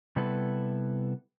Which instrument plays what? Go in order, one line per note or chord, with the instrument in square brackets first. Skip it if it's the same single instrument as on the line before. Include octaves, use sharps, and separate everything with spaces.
[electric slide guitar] C3 G3 B3 E4 A4 B4